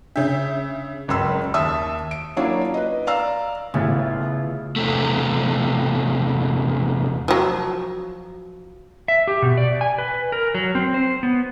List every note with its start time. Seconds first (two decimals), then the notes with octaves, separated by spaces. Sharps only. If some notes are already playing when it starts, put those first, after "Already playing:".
0.16 C#3 D4 C#5 E5
1.08 F#1 C#2 F#2 B5 C6 E6
1.54 D#2 E5 A5 D#6 E6
2.11 D7
2.36 F#3 A#3 C#4 D4 E4 F4
2.74 B4 D#5
3.07 D5 F5 A#5 E6
3.74 A1 C#3 B3 E4 F4
4.76 E2 C3 A3
7.28 F3 F#3
9.08 E5
9.28 G4
9.42 B2
9.58 D5
9.81 G#5
9.98 B4
10.32 A#4
10.55 F#3
10.75 C4
10.94 C5
11.23 B3